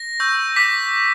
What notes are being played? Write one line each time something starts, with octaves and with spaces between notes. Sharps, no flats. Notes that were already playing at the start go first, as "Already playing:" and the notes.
Already playing: A#6
C#6 E6 G6
D6 G6 B6